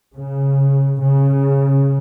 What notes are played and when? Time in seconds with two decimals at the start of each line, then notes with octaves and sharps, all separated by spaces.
0.16 C#3
1.00 C#3